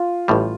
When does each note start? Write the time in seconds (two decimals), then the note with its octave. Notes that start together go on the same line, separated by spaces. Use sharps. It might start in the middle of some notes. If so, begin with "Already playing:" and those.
Already playing: F4
0.28 A1 A2 G3